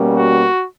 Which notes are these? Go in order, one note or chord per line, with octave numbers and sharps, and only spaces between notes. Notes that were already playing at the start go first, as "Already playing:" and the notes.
Already playing: B2 G3 A#3 C#4
F#4